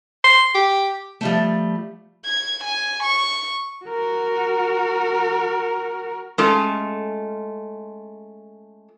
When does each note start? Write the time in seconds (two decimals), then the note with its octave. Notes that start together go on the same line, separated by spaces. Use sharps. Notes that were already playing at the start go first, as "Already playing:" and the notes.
0.24 C6
0.55 G4
1.21 F3 G3 A3
2.26 G#6
2.64 G#5
3.03 C#6
3.85 F#4 A#4
6.38 G#3 A3 C#4 F4 A4